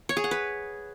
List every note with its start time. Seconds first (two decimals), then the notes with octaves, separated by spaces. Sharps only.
0.09 C#5
0.17 G#4
0.24 F#5
0.31 B4